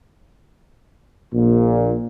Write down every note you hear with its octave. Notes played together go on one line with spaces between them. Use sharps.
A#1 A#2